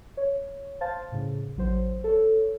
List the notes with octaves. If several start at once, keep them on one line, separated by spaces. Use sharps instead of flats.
C#5
C5 F5 A5 A6
A2 C#3
A1 F#3 C5
A4 C#5